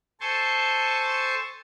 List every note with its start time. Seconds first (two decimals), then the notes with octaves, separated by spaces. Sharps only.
0.21 A4 C5 G#5 A5 C6 C#6